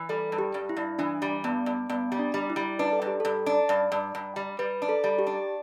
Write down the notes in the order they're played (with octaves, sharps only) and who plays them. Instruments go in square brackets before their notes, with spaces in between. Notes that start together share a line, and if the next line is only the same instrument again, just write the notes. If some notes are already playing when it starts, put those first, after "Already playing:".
Already playing: [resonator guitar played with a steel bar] E3
[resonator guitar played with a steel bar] G3 [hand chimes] A4
[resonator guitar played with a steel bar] G2
[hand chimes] G4
[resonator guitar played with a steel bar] G2
[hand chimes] E4
[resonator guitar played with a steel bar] G2
[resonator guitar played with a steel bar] E3 [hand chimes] D4
[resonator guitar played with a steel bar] G3
[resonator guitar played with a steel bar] G2 [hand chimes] B3
[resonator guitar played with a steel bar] G2
[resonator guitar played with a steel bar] G2 [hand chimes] B3
[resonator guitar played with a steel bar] G3
[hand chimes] D4
[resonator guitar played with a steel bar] G3
[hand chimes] E4
[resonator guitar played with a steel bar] G3
[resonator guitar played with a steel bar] D4 [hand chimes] B4
[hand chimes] A4
[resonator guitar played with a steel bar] G2
[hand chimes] G4
[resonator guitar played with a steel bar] G2 [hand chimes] A4
[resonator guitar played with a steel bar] D4
G2
G2
G2
G3
[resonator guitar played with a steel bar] G3 [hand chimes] B4
[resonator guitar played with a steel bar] D4
[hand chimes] A4
[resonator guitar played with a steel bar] G3
[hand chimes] G4
[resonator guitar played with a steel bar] D4